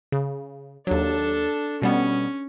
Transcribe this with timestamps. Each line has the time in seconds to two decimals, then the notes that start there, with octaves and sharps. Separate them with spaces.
0.12 C#3
0.87 D#2 F#3 D4 A4
1.82 B2 G3 B3 C#4